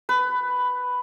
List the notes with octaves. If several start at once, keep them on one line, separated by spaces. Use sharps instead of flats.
B4